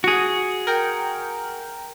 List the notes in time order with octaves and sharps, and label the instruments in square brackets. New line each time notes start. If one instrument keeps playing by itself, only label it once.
[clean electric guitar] F#4 G#4
[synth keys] A#4 G5